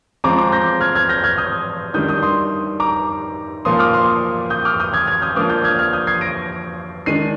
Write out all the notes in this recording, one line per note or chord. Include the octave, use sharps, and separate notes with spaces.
F3 G#3 C4 A#5 D6
A#5 D6
G6 A#6
F6 G#6
F6 G#6
G6 A#6
F6 G#6
D#6 G6
D#3 G3 D4 D#6 G6
D#6 G6
C6 D#6
A#5 D6
A#2 F3 A#3 C6 D#6
D6 F6
C6 D#6
D#6 G6
D6 F6
D#6 G6
F6 G#6
F6 G#6
D#6 G6
F3 A#3 D4 D6 F6
D#6 G6
F6 G#6
F6 G#6
D#6 G6
G#6 C7
A#6 D7
D#3 G#3 D4 C7 D#7